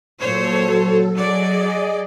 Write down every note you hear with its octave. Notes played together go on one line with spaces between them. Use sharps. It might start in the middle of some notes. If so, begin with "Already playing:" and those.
A#2 F#3 A4 C5 C#5
F#3 G#4 D5 D#5